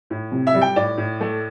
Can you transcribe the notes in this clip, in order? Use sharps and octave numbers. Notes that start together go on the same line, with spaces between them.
A2
C3
E5
G3
G5
A2 D5
A2
A3